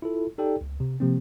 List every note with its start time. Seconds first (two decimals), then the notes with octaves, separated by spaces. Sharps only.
0.02 E4 F4 A4
0.38 D#4 G4 A4 D5 G5
0.61 C#2
0.80 C3
1.00 C3 F3 A#3 C4